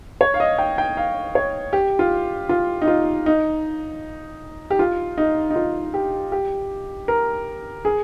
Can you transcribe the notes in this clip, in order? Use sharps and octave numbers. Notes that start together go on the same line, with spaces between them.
C#5
F5
D#5
G5
G5
F5
C#5
G4
F4
F4
D#4
F4
D#4
G4
F4
D#4
D#4
F4
G4
G4
A#4
G#4